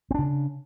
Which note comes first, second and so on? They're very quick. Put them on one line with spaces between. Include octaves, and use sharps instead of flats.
C4 D4 C#3